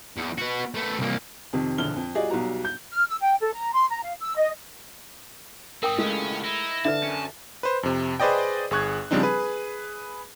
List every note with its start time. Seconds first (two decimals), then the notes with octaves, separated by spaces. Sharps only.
0.17 E2
0.38 B3 F#4
0.74 A3 B3
0.99 C2 A#3
1.53 F2 C3 D#3
1.78 E1 A#1 D3 F6 G7
1.96 F2
2.15 G3 F4 F#4 G#4 D5 D#5
2.30 B1 B2 F#3 G3 F#4 A#5
2.65 G6
2.90 F6
3.08 E6
3.21 G5
3.40 A4
3.54 A#5
3.73 C6
3.89 A#5
4.03 F5
4.19 E6
4.36 D#5
5.83 G#2 C4 A#4 G5 D#6
5.98 C#2 A2 G#3 A3 C#4 D#5
6.44 D#4 E4
6.85 D3 B4 D5 E5 A5
7.03 F#2 C#4
7.63 B4 C5
7.83 F2 C3
8.20 G#4 B4 C5 D5 D#5 G5
8.71 G1 G#4 C#6 F#6 G#6
9.11 C#3 F3 G3 C4 D4 D#4
9.23 G#4 B4